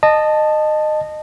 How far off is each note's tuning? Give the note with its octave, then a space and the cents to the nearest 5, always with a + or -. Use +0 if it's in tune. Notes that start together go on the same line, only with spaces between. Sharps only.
D#5 -20 A5 +0